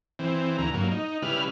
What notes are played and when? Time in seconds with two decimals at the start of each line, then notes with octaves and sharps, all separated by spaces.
0.19 E3 C4
0.58 D2 E3 A#5
0.74 G2 F#3 A#3
0.91 D#4
1.22 C#3 G3 E4 B4 F6